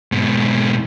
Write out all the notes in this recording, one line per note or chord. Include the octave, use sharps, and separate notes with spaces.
G#2 B2